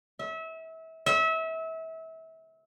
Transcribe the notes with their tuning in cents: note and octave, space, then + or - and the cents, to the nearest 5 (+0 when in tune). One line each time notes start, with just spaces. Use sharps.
E5 -30
E5 -30